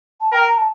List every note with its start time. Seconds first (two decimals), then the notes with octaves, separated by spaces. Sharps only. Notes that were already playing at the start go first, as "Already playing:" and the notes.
0.21 A5
0.32 A#4 G5
0.47 A#5
0.57 A5